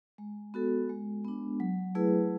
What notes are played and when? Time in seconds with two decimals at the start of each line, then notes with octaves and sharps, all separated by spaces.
0.18 G#3
0.54 B3 F#4 A4
0.89 G#3
1.25 B3 D4
1.60 F#3
1.95 A3 E4 G#4 B4